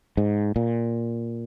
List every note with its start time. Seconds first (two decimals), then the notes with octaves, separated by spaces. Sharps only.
0.17 G#2
0.56 A#2